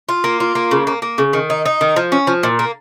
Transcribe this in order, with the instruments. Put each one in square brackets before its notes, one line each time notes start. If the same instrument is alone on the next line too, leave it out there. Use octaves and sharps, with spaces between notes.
[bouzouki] F4
A#3
F4
A#3
C#3
A#3
A#3
C#3
D#3
D#4
D#4
D#3
F3
C#4
F3
A#2
A#3